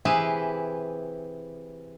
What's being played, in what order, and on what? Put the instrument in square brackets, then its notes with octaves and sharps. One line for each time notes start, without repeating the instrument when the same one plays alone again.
[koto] C3 E3 E4 G4 G#4 B4